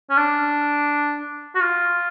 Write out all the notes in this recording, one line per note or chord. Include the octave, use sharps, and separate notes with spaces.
C#4
D4
F#4
F4